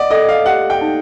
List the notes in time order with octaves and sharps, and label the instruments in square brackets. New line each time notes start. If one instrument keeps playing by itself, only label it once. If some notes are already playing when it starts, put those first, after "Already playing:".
Already playing: [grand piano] D5 D#5 [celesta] F#5
[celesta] A4 [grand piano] D#5
[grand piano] F5
[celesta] G4 [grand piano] F#5
[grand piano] G5
[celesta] D#4